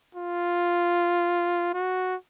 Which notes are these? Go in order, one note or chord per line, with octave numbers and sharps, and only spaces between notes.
F4
F#4